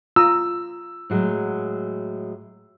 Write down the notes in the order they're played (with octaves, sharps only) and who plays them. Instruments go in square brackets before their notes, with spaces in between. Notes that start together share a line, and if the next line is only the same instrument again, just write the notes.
[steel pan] F4 A#5 D#6 [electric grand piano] E6
[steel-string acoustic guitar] A2 F#3 G#3